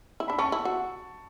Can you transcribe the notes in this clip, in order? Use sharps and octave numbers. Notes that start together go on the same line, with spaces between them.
E4
D4 B5
C#4 A5 C#6
E4
F#4